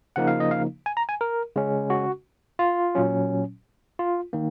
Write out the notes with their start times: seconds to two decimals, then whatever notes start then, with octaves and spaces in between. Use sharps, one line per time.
0.16 C#3 F3 A#3 D#4 F#5
0.28 F5
0.40 D#5
0.51 F5
0.86 G#5
0.97 A#5
1.09 G#5
1.21 A#4
1.56 C#3 G#3 C#4
1.90 F#4
2.59 F4
2.95 A#2 F#3 C#4
3.99 F4
4.33 D#3 A#3